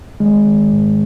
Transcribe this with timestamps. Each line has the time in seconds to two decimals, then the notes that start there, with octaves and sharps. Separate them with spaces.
0.20 D#3 G#3
0.46 D#3
0.73 G#2